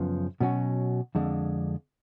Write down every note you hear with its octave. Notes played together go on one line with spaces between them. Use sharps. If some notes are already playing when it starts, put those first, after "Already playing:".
Already playing: F#2 C#3 F3 B3
B2 F#3 C#4 F#4
F2 D3 G#3 D4